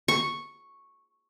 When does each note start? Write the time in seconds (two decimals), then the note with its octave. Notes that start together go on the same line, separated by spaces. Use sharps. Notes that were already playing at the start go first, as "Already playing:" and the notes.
0.08 C#6